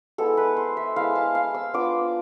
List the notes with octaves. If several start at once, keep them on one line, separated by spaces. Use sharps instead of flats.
G#3 B3 E4 A4
B4
C5
E5
G#3 B3 E4 F5
A5
F5
E6
B3 D4 F4 D6